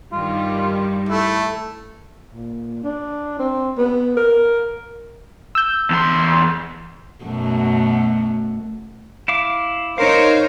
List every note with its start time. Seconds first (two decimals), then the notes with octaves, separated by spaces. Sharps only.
0.12 G2 D#3 G3 F4
1.09 A3 E4
2.31 A#2
2.84 D4
3.39 C4
3.78 B3
4.17 A#4
5.55 E6 G6
5.90 E2 C6
7.24 F#2 B2 A3
9.28 E4 F5 D6
9.98 D#4 A#4 C5 C#5 F5